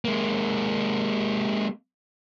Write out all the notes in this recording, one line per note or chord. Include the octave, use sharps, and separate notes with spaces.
G#3 A#3